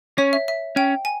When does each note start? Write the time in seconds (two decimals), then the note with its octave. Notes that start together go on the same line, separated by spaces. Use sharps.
0.18 C#4 C#5
0.33 E5
0.48 E5
0.76 C#4 G5
1.05 G#5